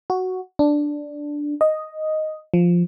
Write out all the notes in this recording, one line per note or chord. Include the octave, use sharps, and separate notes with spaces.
F#4
D4
D#5
F3